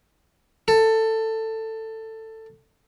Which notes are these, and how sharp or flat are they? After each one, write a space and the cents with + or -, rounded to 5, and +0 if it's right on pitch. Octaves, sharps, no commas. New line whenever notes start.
A4 +15